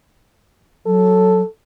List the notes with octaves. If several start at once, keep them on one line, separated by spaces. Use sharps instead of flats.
F#3 A4